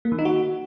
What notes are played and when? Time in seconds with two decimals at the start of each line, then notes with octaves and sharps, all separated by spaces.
0.05 A#3
0.12 D#3
0.19 D#4
0.25 F#4